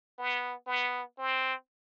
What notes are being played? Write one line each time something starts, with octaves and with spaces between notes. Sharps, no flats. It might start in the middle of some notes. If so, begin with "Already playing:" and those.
B3
B3
C4